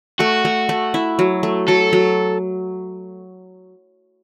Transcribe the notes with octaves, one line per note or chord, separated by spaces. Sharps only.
A3 F#4
A3
A3
E4
F#3
A3
F#3 A4
F#3